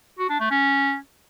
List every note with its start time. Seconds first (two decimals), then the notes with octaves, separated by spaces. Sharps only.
0.19 F#4
0.29 D4
0.40 A3
0.51 C#4